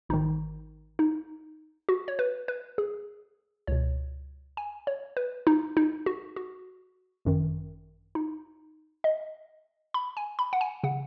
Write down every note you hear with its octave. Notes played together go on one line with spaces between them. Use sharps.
G#1 G#2 D#3 D#4
D#4
F#4
C#5
B4
B4
G#4
C#2 B2 C#5
G#5
C#5
B4
D#4
D#4
F#4
F#4
G#1 F#2 D#3
D#4
D#5
B5
G#5
B5
F#5
G#5
C#3 F#5